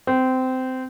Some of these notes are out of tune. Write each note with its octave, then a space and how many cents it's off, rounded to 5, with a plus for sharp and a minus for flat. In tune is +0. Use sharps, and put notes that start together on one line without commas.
C4 -20